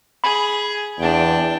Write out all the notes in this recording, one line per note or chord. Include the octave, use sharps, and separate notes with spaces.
G#4 B5
E2 D4 G5